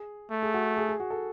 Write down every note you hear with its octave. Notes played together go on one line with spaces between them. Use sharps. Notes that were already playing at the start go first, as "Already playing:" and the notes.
Already playing: G#4
A3
G#4
F#4
G#4
G#4
F#4
A4